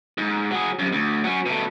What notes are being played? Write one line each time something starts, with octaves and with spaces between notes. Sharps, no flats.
G#2
F#3 G#4
F#2 C3
D2
F#3 C#4
B2 A3